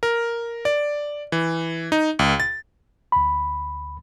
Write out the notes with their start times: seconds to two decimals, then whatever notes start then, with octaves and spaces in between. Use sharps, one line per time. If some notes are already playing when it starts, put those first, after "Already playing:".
0.03 A#4
0.65 D5
1.32 E3
1.92 D#4
2.19 C#2
2.40 A6
3.12 D2 B5